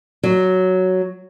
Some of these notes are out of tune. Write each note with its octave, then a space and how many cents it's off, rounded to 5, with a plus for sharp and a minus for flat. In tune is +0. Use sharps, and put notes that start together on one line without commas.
F#3 +5